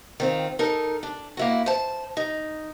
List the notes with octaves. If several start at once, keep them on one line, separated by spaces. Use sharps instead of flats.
D#3 C4 F4
D#4 A4 A#4 A5
D4
A#3 E4 F#4
C5 A5
D#4